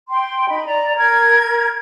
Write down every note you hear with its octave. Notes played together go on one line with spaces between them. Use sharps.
G5 C6
D#4 B5
D5 A#5
A#4 G#6